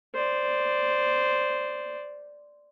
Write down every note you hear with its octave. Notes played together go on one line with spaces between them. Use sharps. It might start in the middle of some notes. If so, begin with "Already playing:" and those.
C5 D5